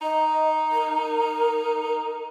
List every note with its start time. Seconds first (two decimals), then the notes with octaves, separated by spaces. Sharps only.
0.02 D#4 D#5
0.71 A#4